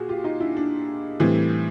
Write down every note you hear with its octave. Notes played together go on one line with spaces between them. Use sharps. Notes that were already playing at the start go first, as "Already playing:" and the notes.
Already playing: A#2 F#4 G#4
F4 G4
D#4 F4
D4 E4
D4
A2 E3 G3 C4